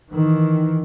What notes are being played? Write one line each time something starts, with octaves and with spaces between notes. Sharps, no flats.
D#3 E3